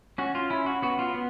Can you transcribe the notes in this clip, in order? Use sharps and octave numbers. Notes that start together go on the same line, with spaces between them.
C#4 F#4
F4
C#4 E4
F#4
B3 F#4
F4
B3